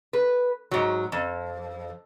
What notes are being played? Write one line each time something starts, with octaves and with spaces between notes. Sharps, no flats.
B4
G#2 F#3
F2